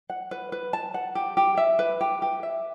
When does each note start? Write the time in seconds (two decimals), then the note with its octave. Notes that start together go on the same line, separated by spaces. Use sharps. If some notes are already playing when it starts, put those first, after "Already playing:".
0.10 F#5
0.31 B4
0.52 B4
0.73 A5
0.94 F#5
1.15 G4
1.37 G4
1.57 E5
1.79 B4
2.01 G4
2.22 G4
2.43 E5